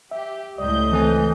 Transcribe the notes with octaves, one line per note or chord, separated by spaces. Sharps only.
G4 E5
C#2 A2 D5 D#5 G6
E3 C4 A4 G#5